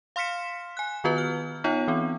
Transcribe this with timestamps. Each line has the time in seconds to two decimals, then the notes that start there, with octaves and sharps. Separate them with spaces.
0.16 F5 C6 F6 B6 C#7 E7
0.77 G#5 F#6
1.04 D#3 B3 F4 F#4 B4
1.18 F6
1.64 B3 D#4 F4 C#5 F#5
1.87 E3 C4